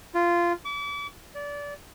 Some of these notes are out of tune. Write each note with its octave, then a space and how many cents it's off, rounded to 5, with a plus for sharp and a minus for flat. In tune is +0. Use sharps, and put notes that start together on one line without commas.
F4 -15
D6 -40
D5 -25